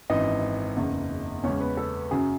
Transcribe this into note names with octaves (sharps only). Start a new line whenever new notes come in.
G#1 F#2 E3 D#4 D#5
F#1 E2 C#3
E2 C#3 G#3 C#4 C#5
B3 B4
A4
F#2 C#3 F#3 G#4